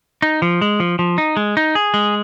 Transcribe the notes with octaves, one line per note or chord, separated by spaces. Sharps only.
D#4
F3
G#3
F3
F3
D#4
G#3
D#4
G#4
G#3